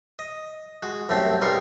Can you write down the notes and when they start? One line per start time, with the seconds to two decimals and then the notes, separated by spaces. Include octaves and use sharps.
0.19 D#5
0.83 G#3 F#4
1.09 C2 F#2 A3 C4
1.41 B1 G3 G#3 A#4 C6 C#6